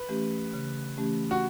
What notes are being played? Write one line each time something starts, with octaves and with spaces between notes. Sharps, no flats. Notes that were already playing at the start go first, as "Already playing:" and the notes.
Already playing: B4
E3 A3 C#4 G4
C#3
E3 A3 C#4 G4
F#4